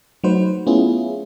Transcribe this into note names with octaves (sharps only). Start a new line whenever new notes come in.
F#3 A3 D#4 F#4 B4 C5
A3 B3 C#4 E4 F4 G#4